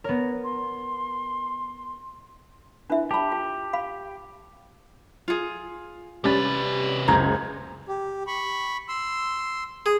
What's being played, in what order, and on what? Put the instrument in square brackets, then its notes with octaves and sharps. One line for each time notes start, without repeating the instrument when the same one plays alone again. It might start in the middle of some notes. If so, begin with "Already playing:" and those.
[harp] B3 A#4 [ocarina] C#5
[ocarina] C6
[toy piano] D4 E5 [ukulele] E4 B4
[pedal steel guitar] G4 [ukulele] A5 B5
[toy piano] F4 [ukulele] A5
[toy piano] F5 B5
[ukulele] F4 G#4
[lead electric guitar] C3 B4 [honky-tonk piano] G3 C#4 A6
[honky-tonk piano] F#1 C#2 G#6 [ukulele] C5 A#5
[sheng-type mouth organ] G4
B5 C#6
C6 E6
[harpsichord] G#4